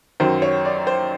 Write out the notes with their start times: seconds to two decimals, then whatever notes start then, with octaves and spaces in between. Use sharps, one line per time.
0.20 F#2 D#3 F#3 C5
0.42 C#5
0.65 D5
0.87 C5